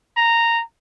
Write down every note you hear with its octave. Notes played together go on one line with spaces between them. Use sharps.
A#5